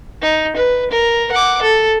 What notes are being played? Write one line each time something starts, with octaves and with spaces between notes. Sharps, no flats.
D#4
B4
A#4
F#5 D6
A4